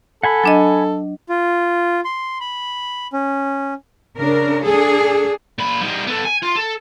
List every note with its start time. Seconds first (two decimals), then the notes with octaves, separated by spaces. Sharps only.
0.23 A4 F#5 G#5 B5
0.44 F#3 D4 D#5
1.29 F4
2.05 C6
2.40 B5
3.13 C#4
4.17 C#3 D4 A#4
4.63 D4 G#4 A4
5.59 A#2 B5
5.82 G3 D#4
6.07 B3 A4
6.25 G#5
6.42 F4
6.56 A4